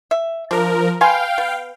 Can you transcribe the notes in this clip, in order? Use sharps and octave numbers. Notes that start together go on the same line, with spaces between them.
E5
F3 D4 A#4
B4 F5 G5 G#5 C6
B3